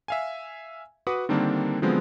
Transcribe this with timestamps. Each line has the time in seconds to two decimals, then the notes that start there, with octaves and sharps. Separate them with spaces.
0.08 E5 F5 G#5
1.07 F#4 B4 F#5 D6 D#6
1.29 D3 D#3 G3 A#3 C4 D4
1.82 D3 F3 F#3 G#3 B3 C4